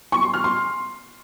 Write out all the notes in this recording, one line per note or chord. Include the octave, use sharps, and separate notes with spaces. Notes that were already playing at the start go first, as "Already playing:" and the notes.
C#6
C6
F6
C6